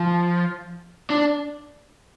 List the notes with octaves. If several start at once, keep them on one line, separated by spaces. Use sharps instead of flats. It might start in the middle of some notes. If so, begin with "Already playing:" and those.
Already playing: F3
D4